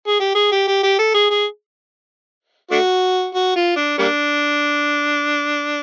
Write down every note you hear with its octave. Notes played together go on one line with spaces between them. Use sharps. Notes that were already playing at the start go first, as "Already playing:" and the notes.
G#4
G4
G#4
G4
G4
G4
A4
G#4
G#4
A3 D4 F#4
F#4
F4
D4
G3 A#3 D4